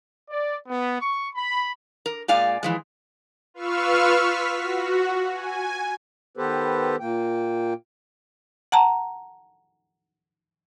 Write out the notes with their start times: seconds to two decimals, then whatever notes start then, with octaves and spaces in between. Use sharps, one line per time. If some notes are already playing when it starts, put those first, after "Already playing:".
0.30 D5
0.67 B3
0.99 C#6
1.34 B5
2.06 A#4
2.28 A#2 G#3 D5 F5 G#5
2.63 E3 F3 G#3
3.54 F4 B4 F5 C#6 E6 F6
4.15 B6
4.56 F#4
5.33 G#5
6.37 D#3 B3 G4 A4 B4 C5
7.00 A#2 A#3 G5
8.72 F#5 A5 A#5